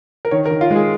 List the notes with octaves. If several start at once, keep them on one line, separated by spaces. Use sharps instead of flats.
A#4
D#3 C#5
A#4
D#3
F4
G#3
G#4